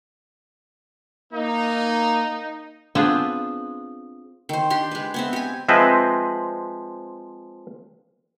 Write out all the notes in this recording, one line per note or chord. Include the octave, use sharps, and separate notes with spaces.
A#3 D#4
B3 C4 D4 F4 G#4
D#3 C5
D4 G4 C6
G#3 B4
B3 C4 E5
G4 G#5
F3 G#3 C4 B4 D#5 E5